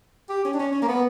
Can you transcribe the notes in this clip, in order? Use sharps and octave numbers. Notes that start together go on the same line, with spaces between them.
G4
C#4
D4
C#4
C#4
A#3
B3